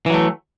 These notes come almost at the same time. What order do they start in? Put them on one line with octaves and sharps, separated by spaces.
E3 F#3 A3